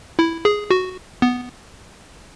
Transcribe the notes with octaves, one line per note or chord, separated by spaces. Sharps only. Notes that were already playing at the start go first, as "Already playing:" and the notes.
E4
G#4
F#4
B3